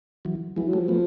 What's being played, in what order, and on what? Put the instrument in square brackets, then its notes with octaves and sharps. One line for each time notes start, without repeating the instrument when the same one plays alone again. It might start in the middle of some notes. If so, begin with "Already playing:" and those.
[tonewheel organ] E3 F#3
[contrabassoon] E3 [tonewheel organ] F#3 G#3
[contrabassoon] F#3
[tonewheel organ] G3 A3
[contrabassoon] F3
[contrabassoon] F3 [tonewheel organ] A3 B3